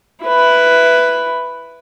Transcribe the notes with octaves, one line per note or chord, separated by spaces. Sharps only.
E4 B4